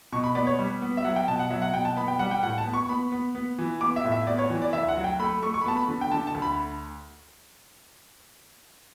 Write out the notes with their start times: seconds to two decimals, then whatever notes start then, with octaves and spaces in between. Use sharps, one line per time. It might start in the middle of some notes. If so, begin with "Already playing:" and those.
0.12 B2 C#6
0.24 B5
0.35 B3 D5
0.47 C#5
0.58 G3
0.81 B3
0.97 E5
1.04 F#3 F#5
1.16 G5
1.27 B2 A5
1.39 F#5
1.50 F#3 E5
1.62 F#5
1.74 B2 G5
1.85 A5
1.97 B3 B5
2.08 G5
2.19 G3 F#5
2.31 G5
2.43 A2 F#5
2.58 A5
2.65 B3
2.73 C#6
2.89 B3 B5
3.12 B3
3.35 B3
3.59 E3
3.81 B3 D6
3.96 E5
4.04 A2
4.12 E5
4.27 B3 D5
4.38 C#5
4.50 E3
4.62 D5
4.73 D2 E5
4.89 F#5
4.97 F#3
5.04 G5
5.19 A3 B5
5.43 A3 C#6
5.54 C#6
5.61 B5
5.66 B3 A5
5.77 B5
5.88 D3
6.01 G5
6.11 D3 A5
6.27 A5
6.34 D2
6.42 B5